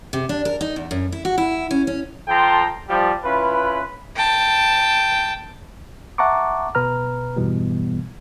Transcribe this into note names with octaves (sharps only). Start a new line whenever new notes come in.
C3
D4
A#4
D#4
E2
F#2
E4
F#4
E4
C#4
C#4
F3 A4 G5 A5 A#5 C6
F3 G3
C#4 E4 F4 B4
G5 A5
E5 F#5 A5 A#5 C#6 D6
B2 B4 A#5 F6
E2 G2 B2 E3 G3 B3